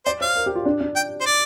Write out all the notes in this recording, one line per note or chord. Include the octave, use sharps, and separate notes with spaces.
C5 D5
C5 F5
A#4
G4
F4
D4
D4
G5
C5
D5